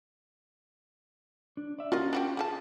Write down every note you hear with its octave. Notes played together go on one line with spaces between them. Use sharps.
D4
D5 E5
C#4 F4 F#4 A#4 D#5
D4 F#4 G4
C#3 F#4 G#4 A5